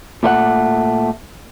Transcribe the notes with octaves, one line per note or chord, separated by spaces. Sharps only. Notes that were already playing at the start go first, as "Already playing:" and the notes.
A#2 A3 C5 F#5